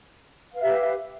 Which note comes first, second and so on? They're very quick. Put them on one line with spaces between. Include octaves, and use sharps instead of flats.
F5 B4 E5 G4